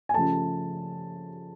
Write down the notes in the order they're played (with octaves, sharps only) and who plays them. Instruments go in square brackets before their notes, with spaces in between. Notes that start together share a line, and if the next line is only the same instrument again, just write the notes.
[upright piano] G#5
C#3 F3 A3 A5